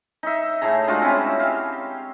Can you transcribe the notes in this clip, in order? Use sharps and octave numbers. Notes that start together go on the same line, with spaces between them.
D#4 E5
A2 A3 G#4 A#5
G#3 D4 F4 F#4
C4 C#4 E4
G4 F5